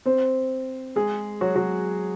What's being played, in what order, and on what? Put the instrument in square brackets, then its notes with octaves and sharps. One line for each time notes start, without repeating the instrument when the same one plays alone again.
[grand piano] C4 C5
G#3 G#4
F#3 F#4
F#3 F#4